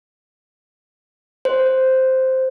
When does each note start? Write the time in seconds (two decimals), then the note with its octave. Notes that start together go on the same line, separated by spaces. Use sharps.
1.45 C5